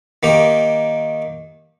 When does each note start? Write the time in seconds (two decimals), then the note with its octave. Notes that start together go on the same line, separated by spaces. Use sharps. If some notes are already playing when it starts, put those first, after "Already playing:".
0.23 D#3 A#3 G4